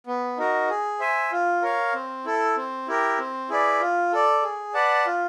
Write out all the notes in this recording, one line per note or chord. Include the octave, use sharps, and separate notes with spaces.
B3
D#4 F#4 A#4
G#4
C5 E5 G#5
F4
A#4 C#5 F5
C4
E4 A4
C4
E4 G4 A#4
C4
E4 G#4 B4 D5
F4
A4 D5
G#4
B4 D5 F#5 A5
F4